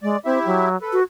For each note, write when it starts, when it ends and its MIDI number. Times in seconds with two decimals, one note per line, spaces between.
0.03 0.17 56
0.03 0.19 74
0.25 0.39 60
0.25 0.69 64
0.25 0.69 67
0.25 0.69 76
0.45 0.76 54
0.82 1.00 69
0.82 1.00 71
0.93 1.03 66